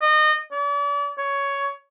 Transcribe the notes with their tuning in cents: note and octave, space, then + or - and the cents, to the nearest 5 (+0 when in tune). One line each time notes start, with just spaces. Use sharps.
D#5 -30
D5 -40
C#5 +10